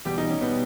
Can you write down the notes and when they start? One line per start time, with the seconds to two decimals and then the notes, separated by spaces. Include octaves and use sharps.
0.05 E2 B2 G3 G4
0.18 D#4
0.30 C#4
0.41 B2 G3 B3